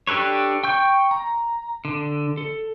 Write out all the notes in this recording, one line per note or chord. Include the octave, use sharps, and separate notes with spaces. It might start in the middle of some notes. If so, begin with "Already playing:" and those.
D4 G4 A4 B4 C#5
G5 C#6 G6
A#5
D3
A4